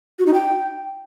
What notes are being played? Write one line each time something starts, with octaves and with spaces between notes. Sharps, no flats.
F#4
D#4
G5